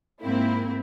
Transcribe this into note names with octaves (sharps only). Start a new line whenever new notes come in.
G#2 A#3 C4 E4